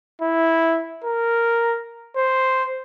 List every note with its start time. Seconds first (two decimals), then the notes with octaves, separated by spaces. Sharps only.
0.22 E4
1.04 A#4
2.16 C5